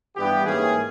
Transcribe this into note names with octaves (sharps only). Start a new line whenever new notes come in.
G2 E3 G3 B3 G4
G#2 E3 A#3 C#4 G#4